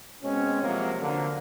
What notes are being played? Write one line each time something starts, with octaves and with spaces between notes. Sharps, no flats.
B2 G#3 C4 C#4
C3 F3 F#3 G#3 A#3
D3 A#3